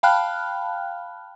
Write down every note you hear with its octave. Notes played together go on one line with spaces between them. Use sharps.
F5 G5 A5 B5 F6 F#6